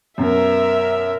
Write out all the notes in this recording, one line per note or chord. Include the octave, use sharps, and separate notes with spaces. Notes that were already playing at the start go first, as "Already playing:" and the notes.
F#2 B2 A#4 E5